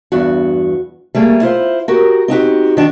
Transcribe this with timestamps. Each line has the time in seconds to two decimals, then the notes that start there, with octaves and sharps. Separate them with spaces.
0.12 E2 G2 F#4
1.15 G3 A3 A#3 G#4
1.41 E4 F4 C5
1.88 F#4 G4 A#4
2.28 C4 D#4 F#4 G4
2.77 D#3 D4 F#4